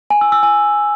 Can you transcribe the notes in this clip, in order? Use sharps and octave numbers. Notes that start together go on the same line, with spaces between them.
G#5
E6
E6
G#5